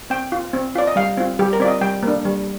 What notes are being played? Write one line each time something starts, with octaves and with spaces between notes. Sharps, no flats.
C4 G5
F4
C4
F4 D5
D#5
G3 F5
C4 F4
G3 G4
A#4
C4 F4 D5 D#5
G3 G5
A#3 D4
G3